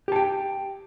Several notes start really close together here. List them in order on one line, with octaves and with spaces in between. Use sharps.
G4 A5 G5